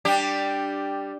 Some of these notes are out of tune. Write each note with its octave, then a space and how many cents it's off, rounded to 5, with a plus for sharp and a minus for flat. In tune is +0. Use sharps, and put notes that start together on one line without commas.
G3 +5 D4 +0 G4 +0